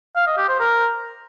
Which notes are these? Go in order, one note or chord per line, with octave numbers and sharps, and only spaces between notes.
F5
D#5
G4
C5
A#4